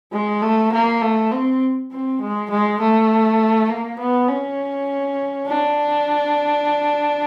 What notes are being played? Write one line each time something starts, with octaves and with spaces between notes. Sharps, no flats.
G#3
A3
A#3
A3
C4
C4
G#3
G#3
A3
A#3
B3
C#4
D4